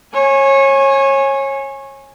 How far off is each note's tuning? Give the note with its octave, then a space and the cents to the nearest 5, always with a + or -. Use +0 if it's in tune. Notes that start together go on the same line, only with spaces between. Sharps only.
C#5 -25 G#5 +0